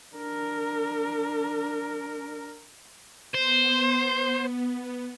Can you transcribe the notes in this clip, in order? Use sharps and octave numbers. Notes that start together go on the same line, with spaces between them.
D4 A#4
B3 C5